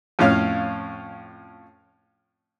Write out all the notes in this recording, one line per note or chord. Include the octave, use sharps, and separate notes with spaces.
F2 A2 C#4 F5 F6